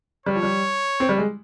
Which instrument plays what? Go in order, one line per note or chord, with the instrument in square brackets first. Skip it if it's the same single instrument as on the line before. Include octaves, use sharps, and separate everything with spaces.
[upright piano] G3 [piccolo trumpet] C#5
[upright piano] F3
G3
C4
G3
G#3